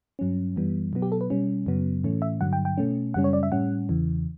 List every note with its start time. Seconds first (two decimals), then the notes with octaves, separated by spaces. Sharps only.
0.19 G2 F#3 C#4
0.56 F#2 E3 G3 B3
0.93 B2 F#3 B3
1.02 G4
1.12 A4
1.21 B4
1.30 B2 G3 C#4
1.66 F#2 C#3 F#3 B3
2.04 A2 E3 A3 C#4
2.22 E5
2.41 G2 D3 F#3 F#5
2.53 G5
2.65 G5
2.78 B2 A3 C#4
3.14 F#2 C#3 G3 C#4 F#5
3.24 C#5
3.33 D5
3.43 E5
3.52 A2 G3 C#4 F#5
3.89 E2 C#3 E3